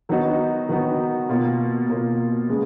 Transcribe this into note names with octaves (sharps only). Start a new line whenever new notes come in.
D#3 F#3 B3 D#4 F#4
D#3 F#3 B3 D#4 F#4
B2 A#3 F4
B2 A#3 F4
C#3 G#3 B3